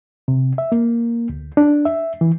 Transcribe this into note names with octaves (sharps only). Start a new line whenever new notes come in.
C3
E5
A#3
D2
D4
E5
E3